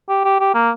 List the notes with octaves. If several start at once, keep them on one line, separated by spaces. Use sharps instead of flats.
G4
G4
G4
A#3